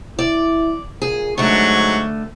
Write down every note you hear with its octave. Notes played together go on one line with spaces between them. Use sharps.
E4 D5
A#2 G#4
G#2 D3 F#3 A3 C#6